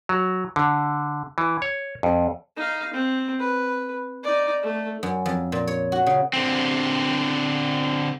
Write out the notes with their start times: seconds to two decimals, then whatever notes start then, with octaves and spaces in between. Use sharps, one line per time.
0.09 F#3
0.56 D3
1.38 E3
1.62 C#5
2.03 F2
2.57 D#4 F5
2.94 C4
3.40 B4
4.24 D#4 D5
4.63 A3
5.03 F#2
5.26 F2
5.52 A#2
5.67 C#5
5.92 F#4
6.06 C#3
6.33 D3 C4